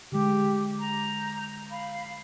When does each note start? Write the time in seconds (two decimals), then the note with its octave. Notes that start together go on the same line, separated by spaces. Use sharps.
0.12 D3 G#3 G4
0.80 A#5 G6
1.70 F5 B5